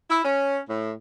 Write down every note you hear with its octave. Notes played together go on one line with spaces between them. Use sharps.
E4
C#4
A2